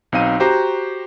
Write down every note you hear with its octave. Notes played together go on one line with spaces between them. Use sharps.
B1 C4 D#4 F5 D#7
F#4 G4 C5 A#5